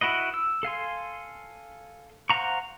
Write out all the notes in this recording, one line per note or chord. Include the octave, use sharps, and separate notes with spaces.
E4 F#4 B4 D#5
E6
A4 F5 G#5 C6
C5 F5 F#5 A#5 C#6